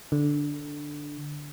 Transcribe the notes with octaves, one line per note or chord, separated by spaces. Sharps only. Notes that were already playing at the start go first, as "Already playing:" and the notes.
D3